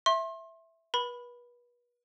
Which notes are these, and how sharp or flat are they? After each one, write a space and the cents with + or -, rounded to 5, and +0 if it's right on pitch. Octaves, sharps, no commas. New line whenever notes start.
E5 +0 C6 +35
B4 -35 B5 +0